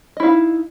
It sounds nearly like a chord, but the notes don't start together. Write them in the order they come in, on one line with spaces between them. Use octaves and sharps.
D#5 E4 F5 D#4